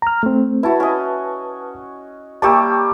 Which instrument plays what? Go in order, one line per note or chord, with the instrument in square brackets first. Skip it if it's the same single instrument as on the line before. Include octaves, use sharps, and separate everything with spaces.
[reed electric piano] A#5 F6
A3 C4
[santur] E4 F#4 [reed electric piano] B4 A5
[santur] C#4 D#5
[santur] G3 A#3 G4 [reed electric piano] A5 C#6 E6